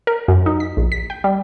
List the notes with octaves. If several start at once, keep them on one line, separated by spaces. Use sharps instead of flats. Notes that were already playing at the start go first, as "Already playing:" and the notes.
A#4
F#2
D#4
B6
A#1
B6
G5
G3